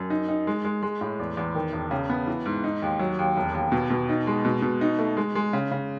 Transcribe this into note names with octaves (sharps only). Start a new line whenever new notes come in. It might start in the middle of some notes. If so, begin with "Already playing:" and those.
Already playing: F#2
D#4
D#4
G#3
G#3
G#3
A2
E2
E2
D#3
E1
C#3
B3
E3
G#2
D#4
D#2
F#3
D#2
E1
D#2
B2
B2
D#4
G#3
B2
B2
D#4
A3
G#3
G#3
C#3
C#3